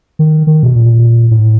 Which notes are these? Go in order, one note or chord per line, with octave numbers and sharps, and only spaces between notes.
D#3
D#3
B2
A#2
A2